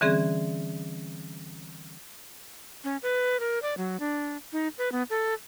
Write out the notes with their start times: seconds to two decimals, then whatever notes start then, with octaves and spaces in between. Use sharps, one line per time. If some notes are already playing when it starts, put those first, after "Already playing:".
0.01 D3 E3 G3 C4 C#4 G#4
2.84 C#4
3.03 B4
3.40 A#4
3.62 D5
3.77 F#3
4.00 D4
4.53 D#4
4.78 B4
4.92 B3
5.10 A4